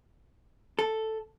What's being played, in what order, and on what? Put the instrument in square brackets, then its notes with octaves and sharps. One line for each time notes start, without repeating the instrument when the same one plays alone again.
[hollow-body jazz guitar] A4